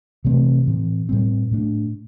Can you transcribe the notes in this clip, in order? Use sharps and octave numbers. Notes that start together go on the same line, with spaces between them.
C3 E3 A3 C4
A2 E3 C4
A2 G3 C4
A2 A3 D4